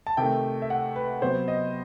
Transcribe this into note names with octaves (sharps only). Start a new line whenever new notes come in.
A5
C3 D#3 A3 G5
E5
F#5
B4
C3 F#3 B3 C5
D#5